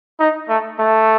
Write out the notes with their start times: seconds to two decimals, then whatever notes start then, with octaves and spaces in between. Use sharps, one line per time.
0.20 D#4
0.49 A3
0.79 A3